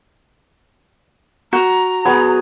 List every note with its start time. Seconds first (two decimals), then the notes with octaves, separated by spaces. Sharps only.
1.53 F#4 A#5
2.05 F#3 B3 G#4